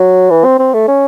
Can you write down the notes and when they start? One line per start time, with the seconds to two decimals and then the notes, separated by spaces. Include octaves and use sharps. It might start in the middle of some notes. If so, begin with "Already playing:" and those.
Already playing: F#3
0.30 E3
0.44 C4
0.59 C4
0.74 A3
0.88 C#4